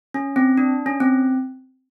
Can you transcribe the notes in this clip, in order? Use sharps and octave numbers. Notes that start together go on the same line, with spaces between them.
C#4
C4
D4
C#4
C4